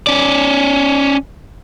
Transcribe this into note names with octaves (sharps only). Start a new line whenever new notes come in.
C#4 D5